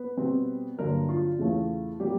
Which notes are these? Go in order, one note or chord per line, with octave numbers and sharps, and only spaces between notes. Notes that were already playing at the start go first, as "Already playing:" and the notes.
Already playing: B3 B4
B2 G3 C4
G2 D3 F#3 A#3 A#4
F4
E2 C#3 E3 A3 C#4
A#2 F#3 G3 A#3 G4